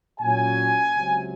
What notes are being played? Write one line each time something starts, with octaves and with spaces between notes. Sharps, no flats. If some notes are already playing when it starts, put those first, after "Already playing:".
A#2 F#3 C#4 G#5
C#2 C3 F#3